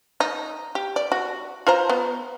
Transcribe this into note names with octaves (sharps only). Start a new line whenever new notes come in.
D#4
G4
D5
F#4
F4 C5 A#5
B3